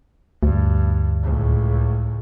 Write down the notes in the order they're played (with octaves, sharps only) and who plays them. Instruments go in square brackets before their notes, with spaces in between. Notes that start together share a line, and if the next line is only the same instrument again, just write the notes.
[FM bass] D2 [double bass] G2
[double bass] C#2 A2